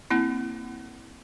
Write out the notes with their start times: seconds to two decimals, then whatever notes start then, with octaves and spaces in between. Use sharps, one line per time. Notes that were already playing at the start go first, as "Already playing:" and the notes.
0.10 A#3 C4 E4